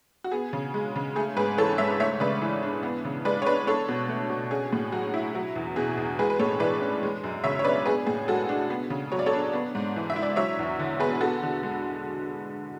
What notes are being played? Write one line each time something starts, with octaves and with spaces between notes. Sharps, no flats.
F#4
B3 G#4
C#3
G#3
C#3
A3 G#4
G#2 G#4 B4
E3 A4 C#5
G#2 C#5 E5
A3 C#5 E5
C#3 B4 D5
E3
D4
B3
C#3
G#3 B4 D5
C#5
D4 B4 D5
D4 A4 C#5
B2
A3
B2
C#4 G#4
A2
F#3 F#4
E4
F#3
E2
B2 G#4
E2
G#3 G#4 B4
B4
A2 A4 C#5
E3 B4 D5
C#4
G#3
F#2
C#3 C#5 E5
C#5
C#4 B4 D5
B3 G#4 B4
A2 G#4
G#3 F#4 A4
D4
B3
C#3
F#3 C#5
D5
A4 C#5
D4
B3
G#2
E3
E5
E4
D5
F#3 C#5 E5
E2
D3
B3 G#4 B4
B3 F#4 A4
D3
G#3